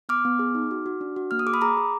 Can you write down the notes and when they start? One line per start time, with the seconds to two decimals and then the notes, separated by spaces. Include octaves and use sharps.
0.09 B3 D6 F6
0.25 B3
0.39 G#4
0.55 D#4
0.71 F#4
0.86 F#4
1.01 D4
1.16 F#4
1.31 A#3 F6
1.39 D#6
1.46 G#4 D6
1.53 B5 D#6
1.61 G#4 A#5 D6
1.77 G#4